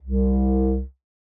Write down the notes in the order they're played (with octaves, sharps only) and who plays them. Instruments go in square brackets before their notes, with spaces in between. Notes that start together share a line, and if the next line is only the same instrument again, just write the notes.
[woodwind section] C2